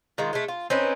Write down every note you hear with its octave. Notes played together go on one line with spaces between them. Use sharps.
D#3 G#3 F4
G#3 A3
F4
C4 C#4 D#4 B4